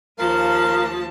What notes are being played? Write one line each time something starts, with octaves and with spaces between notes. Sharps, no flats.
D#2 F3 A#4 F5 A5